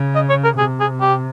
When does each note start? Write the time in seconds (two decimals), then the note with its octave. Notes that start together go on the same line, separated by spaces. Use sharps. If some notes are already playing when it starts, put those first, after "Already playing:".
Already playing: C#3
0.15 D#5
0.29 C#5
0.44 A#4
0.58 C3 G#4
0.80 G#4
1.01 G4